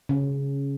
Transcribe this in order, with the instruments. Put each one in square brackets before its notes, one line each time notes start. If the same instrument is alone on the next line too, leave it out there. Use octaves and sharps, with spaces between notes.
[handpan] C#3